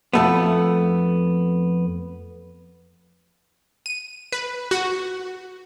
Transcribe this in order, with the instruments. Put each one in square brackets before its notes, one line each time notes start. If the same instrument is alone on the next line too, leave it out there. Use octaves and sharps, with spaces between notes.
[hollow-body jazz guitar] F2 A3 B3
[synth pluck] D#7
B4
F#4